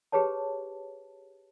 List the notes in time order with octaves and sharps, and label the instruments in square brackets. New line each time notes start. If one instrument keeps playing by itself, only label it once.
[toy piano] G4 G#4 B4 C#5 A5